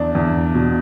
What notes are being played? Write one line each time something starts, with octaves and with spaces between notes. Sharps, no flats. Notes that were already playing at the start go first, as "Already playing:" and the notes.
Already playing: E2 D4
E2
B2